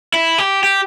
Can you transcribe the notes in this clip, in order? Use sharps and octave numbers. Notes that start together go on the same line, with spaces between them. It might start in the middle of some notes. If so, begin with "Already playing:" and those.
E4
G4
G4